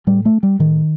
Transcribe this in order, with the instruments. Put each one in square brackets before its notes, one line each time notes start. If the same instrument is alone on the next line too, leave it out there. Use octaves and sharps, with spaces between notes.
[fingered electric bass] A2 G3
A3
G3
A2 D#3